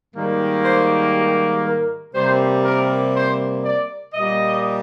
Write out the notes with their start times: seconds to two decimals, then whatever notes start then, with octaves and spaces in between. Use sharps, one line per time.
0.14 G#2 D#3 G3 A#3
0.65 C5
1.14 G4
1.64 A#4
2.14 C3 G3 A#3 C5
2.64 A#4
3.14 C5
3.64 D5
4.13 A#2 G3 A#3 D#5